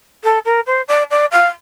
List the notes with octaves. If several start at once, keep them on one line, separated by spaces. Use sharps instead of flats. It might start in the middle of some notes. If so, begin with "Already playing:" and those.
A4
A#4
C5
D5
D5
F5